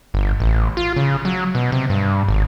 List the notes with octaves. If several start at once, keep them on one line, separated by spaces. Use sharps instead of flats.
G1
A1
F4
C#3
F#3
B2
C3
G2
G#1